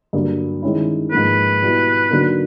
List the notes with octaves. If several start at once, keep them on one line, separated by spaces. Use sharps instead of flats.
G2 D3 F#3 A#3
D#3 G#3 C#4 E4
G#2 F3 A#3 B4
B2 G3 B3 E4
D3 F#3 A#3 D#4